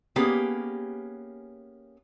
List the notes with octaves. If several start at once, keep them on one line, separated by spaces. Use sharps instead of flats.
A#3 B3 C#4 G4 G#4